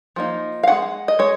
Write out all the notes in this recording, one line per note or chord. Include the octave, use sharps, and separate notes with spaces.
F3 A#3 D#4
F5
G#3 C#4 F#5
D#5
G#3 C#5